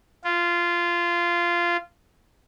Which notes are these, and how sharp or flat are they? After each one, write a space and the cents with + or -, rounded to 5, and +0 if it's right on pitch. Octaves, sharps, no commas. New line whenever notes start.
F4 -15